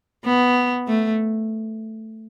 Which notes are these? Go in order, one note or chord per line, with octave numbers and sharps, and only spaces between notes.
B3
A3